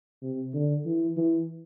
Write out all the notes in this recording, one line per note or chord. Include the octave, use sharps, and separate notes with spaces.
C3
D3
E3
E3